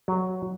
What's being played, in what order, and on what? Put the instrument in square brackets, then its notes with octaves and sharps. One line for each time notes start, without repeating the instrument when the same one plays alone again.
[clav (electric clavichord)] F#3